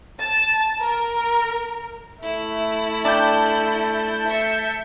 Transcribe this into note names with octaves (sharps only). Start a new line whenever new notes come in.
A5
A#4
A3 E4
D4 G5 A5 G6
E5 C#7